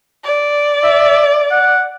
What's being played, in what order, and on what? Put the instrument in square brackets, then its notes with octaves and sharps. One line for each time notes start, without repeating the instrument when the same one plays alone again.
[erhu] D5
[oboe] E5
F#5